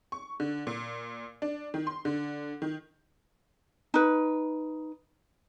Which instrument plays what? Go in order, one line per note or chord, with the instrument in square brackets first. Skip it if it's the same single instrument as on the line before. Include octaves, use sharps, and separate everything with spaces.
[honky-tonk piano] C#6
D3
A#2
D4
D#3
C6
D3
D#3
[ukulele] D#4 B4